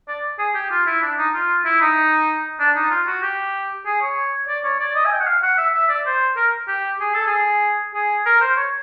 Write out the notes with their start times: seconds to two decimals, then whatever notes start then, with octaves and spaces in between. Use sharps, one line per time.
0.08 D5
0.39 G#4
0.55 G4
0.71 F4
0.87 E4
1.02 D4
1.18 D#4
1.34 F4
1.65 E4
1.81 D#4
2.59 D4
2.76 D#4
2.90 F4
3.07 F#4
3.23 G4
3.85 G#4
4.01 C#5
4.48 D5
4.64 C#5
4.80 D5
4.95 D#5
5.05 G#5
5.13 G5
5.20 F#5
5.27 F5
5.43 F#5
5.58 E5
5.74 E5
5.89 D5
6.06 C5
6.37 A#4
6.68 G4
7.00 G#4
7.14 A4
7.27 G#4
7.94 G#4
8.26 A#4
8.41 C5
8.57 C#5